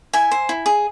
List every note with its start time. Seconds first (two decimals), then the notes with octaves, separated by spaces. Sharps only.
0.13 E4 E5 G#5
0.31 C5
0.49 E4
0.66 G#4